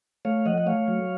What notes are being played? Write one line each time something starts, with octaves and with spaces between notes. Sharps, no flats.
A3 C#5 F5
F3 D#5 F#5
F#5
A3 C#5 F5
F#3